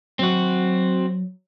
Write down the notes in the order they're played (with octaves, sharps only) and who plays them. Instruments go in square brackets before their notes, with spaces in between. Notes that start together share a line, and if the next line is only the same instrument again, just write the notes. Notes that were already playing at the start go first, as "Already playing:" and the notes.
[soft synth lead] F#3 [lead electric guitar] C4 F#4